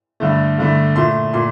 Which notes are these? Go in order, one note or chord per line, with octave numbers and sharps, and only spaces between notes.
G2 D3 A3
G2 D3 A3
A#2 A3 C6
A#2 C6